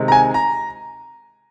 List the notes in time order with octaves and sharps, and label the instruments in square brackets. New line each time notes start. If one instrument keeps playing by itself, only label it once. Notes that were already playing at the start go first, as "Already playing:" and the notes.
Already playing: [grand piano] C3 D#3 G#3
A#5
G#5
A#5